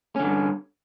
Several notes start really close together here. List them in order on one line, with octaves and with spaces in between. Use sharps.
C#4 D3 G2